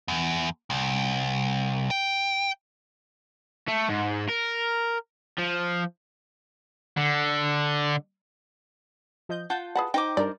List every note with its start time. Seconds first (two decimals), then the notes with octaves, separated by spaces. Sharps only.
0.08 E2
0.70 C2
1.91 G5
3.68 A3
3.89 G#2
4.29 A#4
5.38 F3
6.97 D3
9.29 F3 D#5 G6
9.50 F4 F#5 A5 G6
9.75 G#4 B4 F#5 A5
9.94 D#4 C5 G5 D6
10.17 G2 D4 A#4 D5